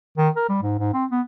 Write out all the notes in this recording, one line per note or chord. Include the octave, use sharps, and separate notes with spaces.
D#3
A#4
G3
G#2
G#2
C4
B3